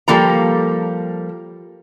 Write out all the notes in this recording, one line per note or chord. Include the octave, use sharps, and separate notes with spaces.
F3 G3 A#3 A4 A#5